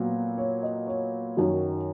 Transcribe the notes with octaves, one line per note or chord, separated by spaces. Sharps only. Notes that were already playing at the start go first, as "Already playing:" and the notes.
Already playing: A#2 F#3 B3
C#5
D#5
C#5
F#2 D#3 F#3